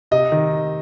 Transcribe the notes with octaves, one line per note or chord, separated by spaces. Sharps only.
C3 D#5
D#3